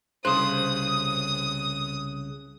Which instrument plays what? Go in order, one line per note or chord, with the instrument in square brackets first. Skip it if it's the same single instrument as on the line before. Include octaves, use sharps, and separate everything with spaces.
[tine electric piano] C2 C#3 F#6 [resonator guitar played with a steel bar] C5 [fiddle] D#6